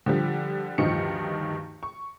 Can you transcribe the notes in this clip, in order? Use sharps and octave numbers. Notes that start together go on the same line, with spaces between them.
D3 F3 G3
D2 G2 D#3 F3 D#4 C#7
C#6